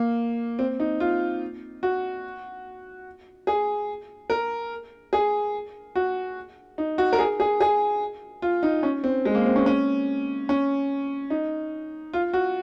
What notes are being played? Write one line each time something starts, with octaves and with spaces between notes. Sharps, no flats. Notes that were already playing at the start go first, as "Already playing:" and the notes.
Already playing: A#3
C4
D#4
F4
F#4
G#4
A#4
G#4
F#4
D#4
F#4
A#4
G#4
G#4
G#4
F4
D#4
C#4
C4
G#3
A#3
C4
C#4
C#4
C#4
D#4
F4
F#4